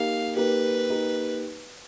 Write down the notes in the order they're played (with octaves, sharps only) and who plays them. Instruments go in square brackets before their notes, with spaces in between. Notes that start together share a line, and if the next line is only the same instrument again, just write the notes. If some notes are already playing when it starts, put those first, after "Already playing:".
Already playing: [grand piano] A#3 D#4 G4 [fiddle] F5
[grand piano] A#3 D#4 G4 [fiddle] B4
[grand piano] A#3 D#4 G4